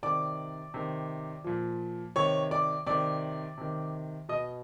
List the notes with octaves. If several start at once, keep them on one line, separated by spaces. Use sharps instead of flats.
C3 D#3 D5 D6
C3 D#3
A#2 F3
C3 D#3 C#5 C#6
D5 D6
C3 D#3 D5 D6
C3 D#3
B2 D#5 D#6